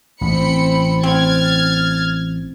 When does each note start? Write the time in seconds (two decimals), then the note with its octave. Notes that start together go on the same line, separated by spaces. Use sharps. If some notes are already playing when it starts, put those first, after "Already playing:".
0.21 A1 C4 B5 C#7
1.03 C4 F6 G#6 A6